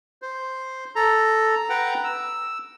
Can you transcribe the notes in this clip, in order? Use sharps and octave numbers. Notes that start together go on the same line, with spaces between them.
C5
A4 A#5
B4 F#5 G5 A#5
E6